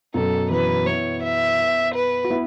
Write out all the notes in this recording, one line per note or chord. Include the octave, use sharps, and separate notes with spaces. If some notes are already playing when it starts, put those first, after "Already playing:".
F#2 B2 A4
B2 E3 B4
B3 E4 C#5
E5
B4
F#4
B3 E4